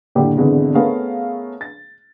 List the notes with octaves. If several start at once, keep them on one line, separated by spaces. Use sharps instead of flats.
F#1 A2 D3 G4
G#1 B2 D3 E3 G#3
A3 B3 C#4 G#4 A#4 F5
A6